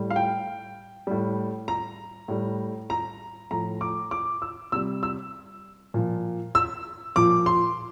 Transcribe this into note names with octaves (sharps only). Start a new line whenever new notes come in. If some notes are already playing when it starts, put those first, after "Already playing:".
Already playing: A2 G3
F5
G5
A2 G3
A#5
A2 G3
A#5
A2 F3 A#5
D6
D6
E6
C3 G3 E6
E6
A#2 F3
E6
A#2 F3 D6
C6